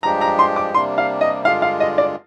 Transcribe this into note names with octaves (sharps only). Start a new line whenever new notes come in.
G2 F3 G#3 D4 G4 A#5
A#5
C6
D6
C3 G3 A#3 D4 C6
F5
D#5
G2 D3 G#3 D4 F4 F5
F5
D#5
D5